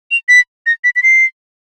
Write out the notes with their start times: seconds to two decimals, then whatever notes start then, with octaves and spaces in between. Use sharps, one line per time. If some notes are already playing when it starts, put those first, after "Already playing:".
0.11 F7
0.29 B6
0.66 A#6
0.84 B6
0.96 B6
1.03 C7